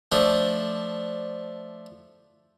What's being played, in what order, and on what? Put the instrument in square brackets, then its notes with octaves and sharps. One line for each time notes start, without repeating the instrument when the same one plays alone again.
[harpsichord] F3 A3 D4